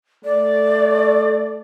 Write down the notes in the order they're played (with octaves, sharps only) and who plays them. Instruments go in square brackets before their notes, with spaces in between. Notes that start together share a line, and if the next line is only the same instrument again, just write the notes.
[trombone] A3 [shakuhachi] D5